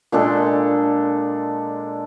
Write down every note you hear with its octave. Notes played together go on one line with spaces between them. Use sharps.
A#2 G#3 D4 A4